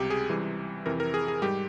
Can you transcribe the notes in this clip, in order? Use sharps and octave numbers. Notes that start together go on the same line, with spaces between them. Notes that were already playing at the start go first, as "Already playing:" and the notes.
Already playing: C#2 C3 G3 G4
G#4
C#2 C3 E3 G3
F2 C3 E3 A#4
A#4
G#4
G#4
G#2 G3 G4